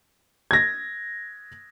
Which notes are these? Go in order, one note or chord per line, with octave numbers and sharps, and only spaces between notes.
G#6 A#6